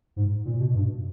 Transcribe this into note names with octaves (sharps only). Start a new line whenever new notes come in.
G#2
A#2
B2
G2